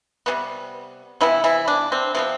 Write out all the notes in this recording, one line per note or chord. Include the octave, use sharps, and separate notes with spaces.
C3 E3 G3 B3
C3 E3 F3 B3 E4
E3 E4
D4
C4
C3 F3 B3 C4